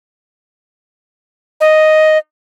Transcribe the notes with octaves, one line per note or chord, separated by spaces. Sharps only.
D#5